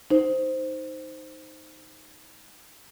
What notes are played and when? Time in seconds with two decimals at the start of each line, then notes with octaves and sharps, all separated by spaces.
0.10 D#4 C5